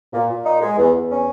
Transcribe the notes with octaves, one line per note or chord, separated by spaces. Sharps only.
A#2
A#2
D#4
G#3
E2
E2
C#4